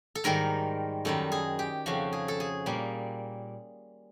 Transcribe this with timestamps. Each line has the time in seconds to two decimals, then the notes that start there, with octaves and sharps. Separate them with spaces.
0.15 A4
0.24 G#2 D#3 G3 A#4
1.05 F#2 D#3 G3 A4
1.32 G#4
1.59 G4
1.86 F2 C#3 F3 F#4
2.13 G#4
2.28 A4
2.40 G#4
2.66 A#2 G3 A#3